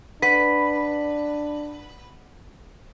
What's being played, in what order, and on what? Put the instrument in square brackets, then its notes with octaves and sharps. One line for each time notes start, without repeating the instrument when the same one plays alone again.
[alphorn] D4 [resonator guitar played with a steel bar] B4 [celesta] F#5 B6